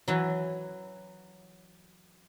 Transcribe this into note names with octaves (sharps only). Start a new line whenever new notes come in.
E3 F#3